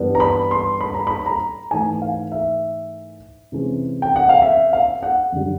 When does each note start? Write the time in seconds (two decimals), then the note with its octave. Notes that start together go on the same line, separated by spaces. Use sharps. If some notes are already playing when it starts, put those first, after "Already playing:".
Already playing: G2 E3 G3 B3 D4
0.15 A#5
0.20 B5
0.51 C6
0.81 B5
0.94 A#5
1.07 B5
1.26 A#5
1.71 G#2 E3 A3 G#5
2.02 F5
2.32 E5
3.52 C3 E3 G#3 C#4
4.02 G5
4.16 F#5
4.29 F5
4.42 E5
4.73 F5
5.03 F#5
5.33 F#2 D3 G3